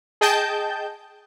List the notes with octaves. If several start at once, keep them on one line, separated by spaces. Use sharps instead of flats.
G#4 D#5 G5 A5 G6